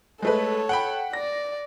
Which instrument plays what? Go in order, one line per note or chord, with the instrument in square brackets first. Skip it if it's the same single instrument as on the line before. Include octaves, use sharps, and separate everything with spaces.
[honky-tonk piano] G#3 A3 B4 [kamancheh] A4 C#5
[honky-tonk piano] F#5 G5 B5
[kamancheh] D5 [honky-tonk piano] A#6